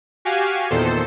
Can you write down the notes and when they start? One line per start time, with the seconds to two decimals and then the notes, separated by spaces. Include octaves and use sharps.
0.25 F#4 G4 F5 G#5
0.70 E2 A#2 D#3 A4 C5